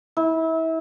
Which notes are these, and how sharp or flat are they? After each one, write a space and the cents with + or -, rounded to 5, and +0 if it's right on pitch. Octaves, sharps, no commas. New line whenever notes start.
E4 -30